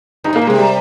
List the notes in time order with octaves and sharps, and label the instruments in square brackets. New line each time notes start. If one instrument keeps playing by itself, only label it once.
[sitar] G2 [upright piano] D#4
[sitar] G#2
[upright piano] A#3
[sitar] A#2
[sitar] C3 [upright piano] G#3
[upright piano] G3